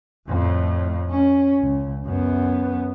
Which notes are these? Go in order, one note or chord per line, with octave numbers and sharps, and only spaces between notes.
F2 A2
C#4
C#2
F#2 B3